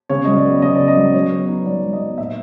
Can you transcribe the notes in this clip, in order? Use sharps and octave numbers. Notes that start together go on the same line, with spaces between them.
C#3 C#5
F#3 D#5
D5
B3
C#3 D#5
C#3 D5
D#5
F#3
F#3 C#5
B3
D#4
F#3 D5
F#3
D#5
B3
A#2 E5